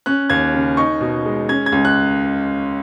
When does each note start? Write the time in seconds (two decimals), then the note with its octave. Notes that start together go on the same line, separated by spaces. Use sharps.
0.06 C#4 F#6
0.30 D#2 G#6
0.54 C#3
0.77 D#4 C#6
1.01 B2
1.25 G#3
1.49 C#4 G#6
1.66 G#6
1.72 C#2
1.85 F#6